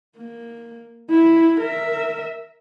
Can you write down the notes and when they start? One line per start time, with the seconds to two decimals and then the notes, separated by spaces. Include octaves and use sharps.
0.17 A#3
1.10 E4
1.60 A#4 E5